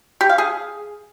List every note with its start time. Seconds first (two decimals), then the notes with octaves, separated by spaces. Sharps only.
0.21 G4
0.29 F5
0.38 G#4